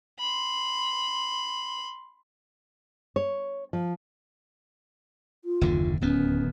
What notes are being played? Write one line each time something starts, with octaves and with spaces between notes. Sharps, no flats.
B5 C6
C#5
F3
F4
F#1 D#2 D3
D1 D#2 B3 C#4